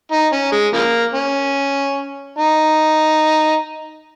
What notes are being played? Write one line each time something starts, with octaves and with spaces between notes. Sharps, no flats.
D#4
C#4
G#3
C#3 F3 A#3
C#4
D#4